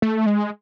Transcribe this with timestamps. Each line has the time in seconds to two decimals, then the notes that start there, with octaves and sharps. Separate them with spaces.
0.02 A3
0.26 G#3